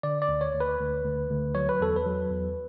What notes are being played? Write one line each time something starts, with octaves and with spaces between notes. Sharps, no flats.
D3 D5
D5
D2
C#5
D2
B4
D2
D2
D2
F#3 C#5
B4
E2 A4
B4
F#3
E2